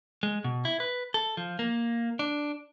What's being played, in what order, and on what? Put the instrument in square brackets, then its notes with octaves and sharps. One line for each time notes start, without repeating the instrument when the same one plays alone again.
[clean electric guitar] G#3
B2
E4
B4
A4
F3
A#3
D4